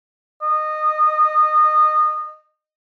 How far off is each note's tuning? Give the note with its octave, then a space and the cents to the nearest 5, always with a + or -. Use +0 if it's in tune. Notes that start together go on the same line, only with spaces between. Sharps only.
D#5 -20